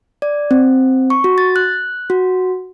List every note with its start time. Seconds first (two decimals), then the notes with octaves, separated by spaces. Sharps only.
0.22 D5
0.51 C4
1.10 C#6
1.24 F#4
1.38 A6
1.56 F#6
2.10 F#4